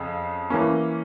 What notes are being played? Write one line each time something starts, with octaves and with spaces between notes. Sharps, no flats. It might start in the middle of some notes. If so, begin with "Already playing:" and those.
Already playing: F2 C#3
E3 A#3 C#4